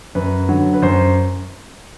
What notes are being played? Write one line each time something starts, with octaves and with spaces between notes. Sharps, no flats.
F#2 B4
D3 F#3
B4
F#2 C5